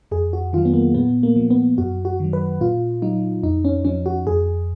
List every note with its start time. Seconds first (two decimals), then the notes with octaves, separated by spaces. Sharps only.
0.11 F2 G#4
0.33 F#4
0.53 D#3 F#3 F4
0.65 B3
0.74 A#3
0.95 A#2 B3
1.23 A#3
1.36 F3
1.50 B3
1.78 F#2 F#4
2.05 F#4
2.20 D#3 F#3
2.33 B4
2.60 A#2 F4
3.02 F#3 D#4
3.43 F2 D#4
3.65 C#4
3.85 F3 C#4
4.06 F#4
4.27 F2 G#4